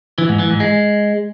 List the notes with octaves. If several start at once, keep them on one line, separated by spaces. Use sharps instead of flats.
E3
G#2
E3
G#2
G#3